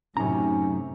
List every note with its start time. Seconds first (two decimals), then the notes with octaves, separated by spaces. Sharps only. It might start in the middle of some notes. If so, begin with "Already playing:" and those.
0.17 F#2 A2 C3 C#4 D#4 A#5